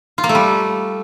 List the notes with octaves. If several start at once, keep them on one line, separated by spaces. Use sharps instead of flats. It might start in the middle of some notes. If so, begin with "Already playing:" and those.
F4
A#3
A3
G3